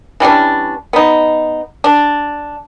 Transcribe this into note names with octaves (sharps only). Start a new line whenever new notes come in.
E3 G3 C#4 D4
B3 D#4
D4